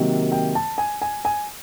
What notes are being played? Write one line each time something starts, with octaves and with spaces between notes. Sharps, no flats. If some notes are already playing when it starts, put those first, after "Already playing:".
Already playing: C3 D#3 F#3 A#3
G5
A5
G#5
G#5
G#5